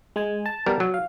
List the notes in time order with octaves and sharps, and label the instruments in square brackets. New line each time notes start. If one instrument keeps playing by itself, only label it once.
[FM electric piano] G#3 G#5
A5
[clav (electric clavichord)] G3 B3 A#4
F#3
[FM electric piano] F5